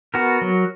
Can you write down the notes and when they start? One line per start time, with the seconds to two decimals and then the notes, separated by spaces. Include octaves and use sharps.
0.14 B3 F#4 A#4
0.41 F#3